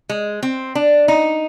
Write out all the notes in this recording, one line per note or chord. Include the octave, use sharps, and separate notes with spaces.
G#3
C4
D4
D#4